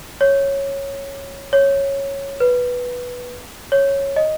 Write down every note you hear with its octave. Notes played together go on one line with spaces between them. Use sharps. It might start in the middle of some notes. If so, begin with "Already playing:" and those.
C#5
C#5
B4
C#5
D#5